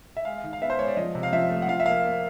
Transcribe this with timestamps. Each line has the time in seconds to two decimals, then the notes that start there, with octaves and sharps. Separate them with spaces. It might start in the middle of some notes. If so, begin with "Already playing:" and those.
0.17 E5
0.25 G#3 F5
0.44 D#3
0.53 F5
0.62 B3 E5
0.70 C5
0.79 G#3 C#5
0.88 D5
0.97 F3 D#5
1.15 C3
1.23 F5
1.32 F3 E5
1.50 A3
1.62 F#5
1.68 F3 F5
1.80 E5
1.86 A#3 F5
2.04 A#3